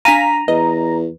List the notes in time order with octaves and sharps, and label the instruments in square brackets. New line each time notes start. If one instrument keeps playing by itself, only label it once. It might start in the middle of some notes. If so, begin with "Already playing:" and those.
[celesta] D4 D#7 [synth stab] F5 G#5 B6 [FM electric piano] A#5
[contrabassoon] E2 [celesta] B4 [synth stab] D#5